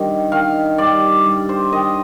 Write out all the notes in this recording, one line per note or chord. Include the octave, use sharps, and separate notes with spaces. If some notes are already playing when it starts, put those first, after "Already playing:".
Already playing: G2 D#3
D#3 F5
G2 D5
G2
C5
D#3 D#5